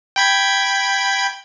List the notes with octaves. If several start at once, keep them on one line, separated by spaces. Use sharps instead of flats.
G5 B5 G#6